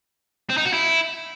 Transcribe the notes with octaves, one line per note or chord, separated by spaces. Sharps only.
C4
D#4
F#4
E4